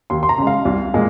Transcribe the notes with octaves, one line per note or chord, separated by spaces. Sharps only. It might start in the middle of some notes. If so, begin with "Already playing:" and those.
D#2 C6
C6
A#5
C#3 G#3
F5
C2
A#2 G#3